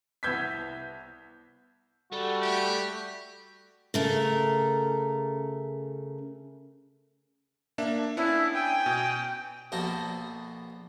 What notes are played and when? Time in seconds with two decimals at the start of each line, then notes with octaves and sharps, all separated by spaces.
0.23 C2 B3 E6 G6 G#6 B6
2.12 G3 A3 F#4
2.42 G4
3.94 C#3 A3 A#4
7.78 A#3 D4 E5
8.17 B3 C#4 D4 E4
8.54 G5 G#5
8.86 B2
9.72 A#1 B2 F#4 A4 C5 A#5